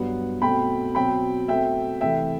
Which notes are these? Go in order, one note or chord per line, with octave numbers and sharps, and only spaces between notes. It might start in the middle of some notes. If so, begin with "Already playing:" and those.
Already playing: G2 F#3 B3 F#5
B2 A3 C4 G5 B5
B2 F#3 C4 G5 B5
B2 A3 C4 E5 G5
C3 E3 A3 E5 G5